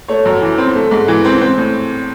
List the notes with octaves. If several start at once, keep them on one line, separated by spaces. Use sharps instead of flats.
A3 C#5
F#2
E3
C4
A3
G#2
E3
C4
C4
A2